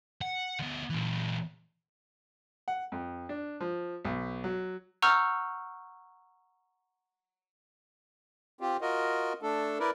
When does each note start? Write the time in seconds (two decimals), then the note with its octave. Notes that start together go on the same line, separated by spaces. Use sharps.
0.21 F#5
0.59 D2 B3
0.90 A#2 E3
2.68 F#5
2.92 F2
3.29 D4
3.60 F3
4.05 B1
4.44 F#3
5.02 F#5 A#5 C#6 E6 F6 G6
8.61 C4 F4 G4
8.81 F4 F#4 A#4 D#5
9.42 A3 D4 A4
9.80 E4 A#4 B4 D5